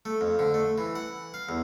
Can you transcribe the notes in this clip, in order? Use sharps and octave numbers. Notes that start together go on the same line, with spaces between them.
A3
F2
D3
A3
E3
F#5
F5
E2